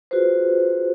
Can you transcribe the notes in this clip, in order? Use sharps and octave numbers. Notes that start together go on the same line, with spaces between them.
F4 F#4 G#4 B4 C5